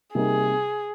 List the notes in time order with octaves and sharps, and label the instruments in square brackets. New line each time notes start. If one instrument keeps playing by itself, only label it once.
[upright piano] C3 G3 A#3 D#4 [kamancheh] G#4